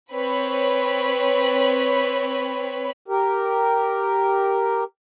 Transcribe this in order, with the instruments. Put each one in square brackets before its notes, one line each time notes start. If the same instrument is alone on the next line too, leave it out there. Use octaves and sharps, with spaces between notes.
[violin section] C4 B4 C#5 B5
[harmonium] G4 A#4